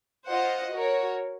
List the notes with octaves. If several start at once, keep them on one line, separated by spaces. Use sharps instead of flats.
F4 C5 D#5 F#5
F#4 A#4 C#5